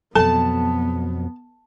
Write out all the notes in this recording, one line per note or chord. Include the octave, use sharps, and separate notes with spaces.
F2 B2 F#3 B3 A4 A5